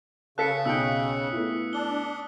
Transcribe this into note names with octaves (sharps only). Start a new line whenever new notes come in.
C#3 A4 F5 A5 F#6 B6 C#7
B1 B2 G5 D#6 E6
A3 B3 E4
D4 G7